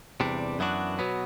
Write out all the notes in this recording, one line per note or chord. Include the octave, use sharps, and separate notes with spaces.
E2 C3 G3 D4
F#2 E3 B3 D4 F#4
B2 F#3 B3